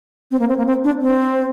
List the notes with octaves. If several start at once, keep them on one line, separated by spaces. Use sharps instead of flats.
C4
A#3
C4
A#3
C4
D4
C4